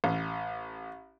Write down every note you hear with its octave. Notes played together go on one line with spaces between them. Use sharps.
A1